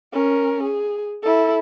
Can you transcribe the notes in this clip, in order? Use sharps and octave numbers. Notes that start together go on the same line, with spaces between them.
C#4 A#4
G#4
E4 A4